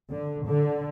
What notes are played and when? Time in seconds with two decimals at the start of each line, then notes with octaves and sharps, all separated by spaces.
0.11 D3
0.47 D3